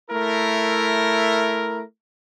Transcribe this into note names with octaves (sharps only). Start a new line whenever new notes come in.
A3 E4 A#4